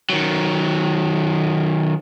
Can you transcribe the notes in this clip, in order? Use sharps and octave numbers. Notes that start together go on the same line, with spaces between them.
D#3 F#3